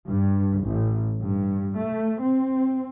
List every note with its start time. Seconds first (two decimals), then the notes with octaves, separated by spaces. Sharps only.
0.10 G2
0.64 A1
1.22 G2
1.78 A3
2.22 C4